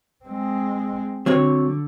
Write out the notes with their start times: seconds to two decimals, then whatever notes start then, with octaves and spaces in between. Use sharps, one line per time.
0.25 G#3 C4
1.26 D3 F#3 C4 C#5